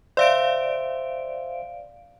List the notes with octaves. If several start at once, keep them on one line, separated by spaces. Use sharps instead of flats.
C5 D5 E5 F5 D7